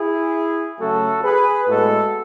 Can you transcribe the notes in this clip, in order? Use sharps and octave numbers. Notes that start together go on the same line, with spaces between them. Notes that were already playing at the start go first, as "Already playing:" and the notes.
Already playing: E4 G#4
C#3 F#3 A3 F#4 A4
G#4 B4
A2 G#3 B3 F#4 A4